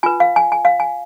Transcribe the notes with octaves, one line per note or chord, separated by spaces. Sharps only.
F4 B4 G#5
F5
G#5
G#5
F5
G#5